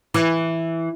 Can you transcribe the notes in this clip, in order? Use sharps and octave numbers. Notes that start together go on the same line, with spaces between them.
E3